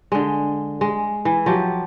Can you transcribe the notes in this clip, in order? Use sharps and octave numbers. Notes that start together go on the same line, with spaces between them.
D3 G#3
G#3
E3
F3 F#3 G4